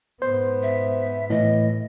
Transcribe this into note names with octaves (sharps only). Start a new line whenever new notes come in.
G#2 B3 C5
E5
A2 E3 D#5